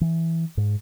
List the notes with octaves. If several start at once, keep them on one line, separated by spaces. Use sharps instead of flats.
E3
G#2